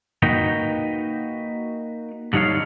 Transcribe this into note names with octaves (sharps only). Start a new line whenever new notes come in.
A#3 D#4 F#4 B4 D#5 G5
D3 G3 D#4 C#5 F5